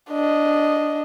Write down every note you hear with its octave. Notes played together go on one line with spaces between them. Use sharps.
D4 D#5